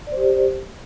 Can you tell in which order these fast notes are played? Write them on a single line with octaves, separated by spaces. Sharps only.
D5 C5 G4